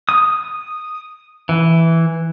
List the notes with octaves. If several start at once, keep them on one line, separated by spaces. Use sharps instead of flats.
D#6
E3